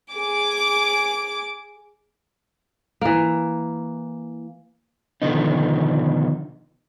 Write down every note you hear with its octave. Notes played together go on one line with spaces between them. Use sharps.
G#4 D6
E3 A#3
B2 D3 D#3 F3 B3 D#4